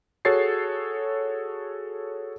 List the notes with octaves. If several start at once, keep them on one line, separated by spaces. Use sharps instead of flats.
F#4 G#4 A4 C#5 A6 C7